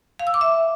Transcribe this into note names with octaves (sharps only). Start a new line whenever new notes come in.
F5
E6
D6
E5